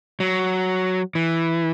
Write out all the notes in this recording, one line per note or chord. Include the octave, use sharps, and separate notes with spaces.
F#3
E3